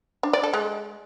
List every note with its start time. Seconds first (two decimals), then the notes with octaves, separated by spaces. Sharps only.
0.23 D4
0.33 D5
0.43 A4
0.54 G#3